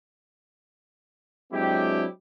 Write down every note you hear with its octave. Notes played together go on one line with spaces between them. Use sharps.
F#3 G#3 C4 D4 E4 G4